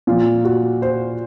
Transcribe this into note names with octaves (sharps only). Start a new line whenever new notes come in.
A#2 F3 F4
F#4
C5